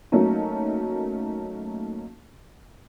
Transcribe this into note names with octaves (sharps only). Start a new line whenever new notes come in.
F#3 A3 A#3 C#4 D#4